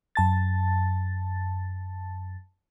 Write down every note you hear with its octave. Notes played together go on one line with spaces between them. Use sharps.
F#2 A5 A6